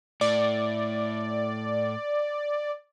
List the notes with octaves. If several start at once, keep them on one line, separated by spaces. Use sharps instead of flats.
A2 D5